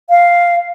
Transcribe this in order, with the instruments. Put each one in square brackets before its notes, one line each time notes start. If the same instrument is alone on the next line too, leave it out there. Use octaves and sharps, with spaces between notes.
[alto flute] F5